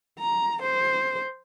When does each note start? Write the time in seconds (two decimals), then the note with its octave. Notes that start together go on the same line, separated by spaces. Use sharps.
0.20 A#5
0.62 C5